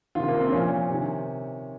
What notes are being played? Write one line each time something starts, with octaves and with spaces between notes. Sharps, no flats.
C3 D#3 F4
A#3
C4
A#2 F3 C#4
C3 D#3